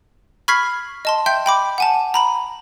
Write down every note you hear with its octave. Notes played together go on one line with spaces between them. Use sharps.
B5 C#6 F6 G#6 B6 C7
D#5 A5 C6
E5 G5 C6 G6
G5 B5 D6
F#5 G#5 A5
A#5 B5 F#7